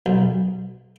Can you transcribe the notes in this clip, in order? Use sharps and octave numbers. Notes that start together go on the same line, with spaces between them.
B1